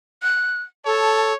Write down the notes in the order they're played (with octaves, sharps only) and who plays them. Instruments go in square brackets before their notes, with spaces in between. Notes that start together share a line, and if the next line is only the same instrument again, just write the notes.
[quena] F#6
[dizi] A4 [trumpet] C#5 [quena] A5